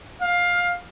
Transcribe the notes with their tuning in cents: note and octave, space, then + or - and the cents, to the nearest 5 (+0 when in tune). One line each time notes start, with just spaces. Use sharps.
F5 +15